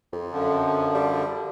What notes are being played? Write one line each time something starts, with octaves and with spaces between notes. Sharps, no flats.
F2
F#2 D3 F3
G3